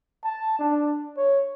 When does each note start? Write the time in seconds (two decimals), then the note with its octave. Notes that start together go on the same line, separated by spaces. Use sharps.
0.24 A5
0.59 D4
1.17 C#5